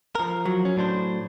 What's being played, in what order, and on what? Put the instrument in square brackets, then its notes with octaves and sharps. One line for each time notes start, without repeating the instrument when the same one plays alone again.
[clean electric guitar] F3 A#4
[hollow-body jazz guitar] F#3
[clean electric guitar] C#4
A2 D4 C5